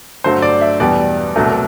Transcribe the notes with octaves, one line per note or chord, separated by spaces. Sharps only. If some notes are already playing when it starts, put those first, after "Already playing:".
G2 D3 F#3 A3 C5
D5
E5
E2 B2 G3 D5
C2 B2 F#3 A3